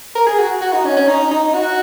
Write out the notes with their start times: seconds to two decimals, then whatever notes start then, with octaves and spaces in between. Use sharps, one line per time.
0.15 A#4
0.27 G#4
0.39 F#4
0.61 F#4
0.73 D#4
0.85 C#4
0.97 C#4
1.08 D#4
1.31 D#4
1.54 F#4